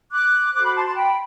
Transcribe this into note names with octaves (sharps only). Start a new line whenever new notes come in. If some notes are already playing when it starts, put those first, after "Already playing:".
D6 F#6
F#4 A4 C5 D6 F#6
B5 D6
A5 C6
A5 C6
G5 B5